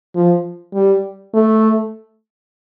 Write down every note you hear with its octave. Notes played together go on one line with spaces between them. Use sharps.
F3
G3
A3